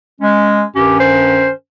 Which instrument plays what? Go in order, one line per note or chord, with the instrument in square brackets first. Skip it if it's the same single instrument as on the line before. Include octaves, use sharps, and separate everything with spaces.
[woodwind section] G#3 C#4
[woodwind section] G2 D#3 C#4 [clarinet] G4
[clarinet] C5